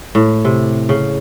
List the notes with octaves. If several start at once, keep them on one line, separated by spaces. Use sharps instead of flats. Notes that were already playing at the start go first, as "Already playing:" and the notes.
A2
C3
C#3